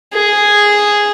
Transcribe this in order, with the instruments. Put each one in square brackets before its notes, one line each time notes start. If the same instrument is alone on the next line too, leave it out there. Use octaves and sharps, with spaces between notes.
[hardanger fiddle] G#4